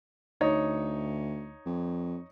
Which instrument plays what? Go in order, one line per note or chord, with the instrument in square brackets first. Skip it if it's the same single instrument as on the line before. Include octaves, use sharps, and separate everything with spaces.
[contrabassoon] D2 [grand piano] D#4 C#5
[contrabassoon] F2